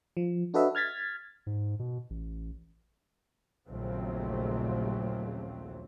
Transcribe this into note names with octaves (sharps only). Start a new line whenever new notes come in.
F3
D4 F#4 A4 B4 D#5 E5
F6 G#6 A6 B6
G#2
B2
A1
A#1 D#2 C#3 F#3 A3 C4